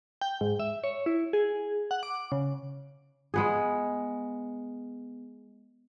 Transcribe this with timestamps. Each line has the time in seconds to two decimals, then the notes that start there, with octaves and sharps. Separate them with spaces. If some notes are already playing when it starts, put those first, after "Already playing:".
0.21 G5
0.41 G#2
0.60 E5
0.84 C#5
1.06 E4
1.33 G#4
1.91 F#5
2.03 D6
2.32 C#3
3.34 G#3 B3 G#4